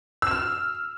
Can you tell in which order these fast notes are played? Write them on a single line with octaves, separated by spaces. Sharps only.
E6 E7 F6